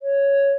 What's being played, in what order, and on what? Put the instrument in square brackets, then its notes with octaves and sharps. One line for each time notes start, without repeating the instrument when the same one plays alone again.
[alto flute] C#5